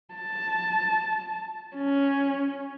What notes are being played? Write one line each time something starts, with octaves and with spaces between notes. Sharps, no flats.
A5
C#4